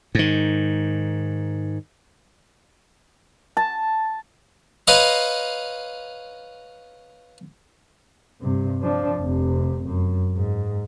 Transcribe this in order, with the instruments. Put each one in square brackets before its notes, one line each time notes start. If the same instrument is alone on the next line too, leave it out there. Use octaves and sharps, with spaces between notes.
[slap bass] G#2 D#3
[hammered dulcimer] A5
[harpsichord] B4 C#5 D#5 F5 A#5 C6
[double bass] G2 C3
F3 D4
F1 C3
F#2
G#2